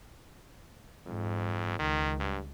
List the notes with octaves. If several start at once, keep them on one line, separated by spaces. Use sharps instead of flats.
F2 G#2
C#2 D#3
G2